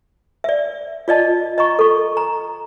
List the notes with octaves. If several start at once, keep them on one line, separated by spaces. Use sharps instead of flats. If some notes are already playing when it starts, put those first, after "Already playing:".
D5 E5
F4 D5 D#5 A5
D#5 A#5 C#6
A4 C#6
A#5